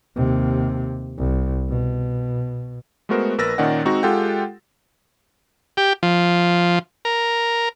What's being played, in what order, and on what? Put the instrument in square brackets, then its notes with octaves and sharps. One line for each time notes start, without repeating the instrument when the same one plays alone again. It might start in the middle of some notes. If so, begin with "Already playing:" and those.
[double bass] D#2 C3
C2
B2
[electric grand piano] G#3 A3 B3 F#4 A#4 C5
A#1 A#4 B4 E6 A6 A#6
A#2 D#3 C#4 D5 D#5 F#5
G#3 C4 D#4 F#4
G#3 F4 G4 A4 F#5 G5
[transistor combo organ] G4
F3
A#4